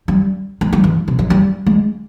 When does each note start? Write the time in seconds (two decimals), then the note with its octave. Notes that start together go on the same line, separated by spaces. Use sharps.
0.08 G3
0.61 G#3
0.73 G3
0.84 E3
1.08 C3
1.19 F3
1.30 G3
1.66 G#3